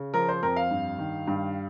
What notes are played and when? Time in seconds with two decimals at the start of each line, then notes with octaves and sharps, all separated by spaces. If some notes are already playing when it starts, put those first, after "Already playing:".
Already playing: C#3
0.14 F3 A#4
0.29 C5
0.43 F2 A#4
0.57 F5
0.71 G2
0.98 D#3
1.27 G2